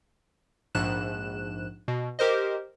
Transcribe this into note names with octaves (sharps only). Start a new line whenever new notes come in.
A#1 G#2 F#6 E7
B2
G4 A#4 C5 D#5